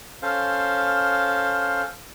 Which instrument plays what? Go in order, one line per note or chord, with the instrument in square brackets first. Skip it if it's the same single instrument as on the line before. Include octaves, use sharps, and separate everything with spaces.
[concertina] C#4 A4 C5 F5